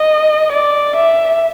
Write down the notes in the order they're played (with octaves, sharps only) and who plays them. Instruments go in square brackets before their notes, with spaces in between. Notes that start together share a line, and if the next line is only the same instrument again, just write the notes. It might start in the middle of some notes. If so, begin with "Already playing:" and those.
Already playing: [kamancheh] D#5
D5
E5